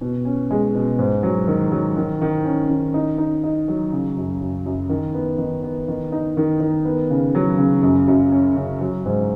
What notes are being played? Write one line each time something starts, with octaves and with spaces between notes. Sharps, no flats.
B2
C#4
G#3
B2
G#2
F#3
D#3
F#3
D#3
D#3
C#4
D#3
D#4
D#4
D#4
F#3
C#3
F#2
F#2
F#2
D#3
B3
D#3
B3
D#3
D#4
D#3
D#3
B3
C#3
F#3
C#3
F#2
F#2
C#4
C#3
F#3
G#2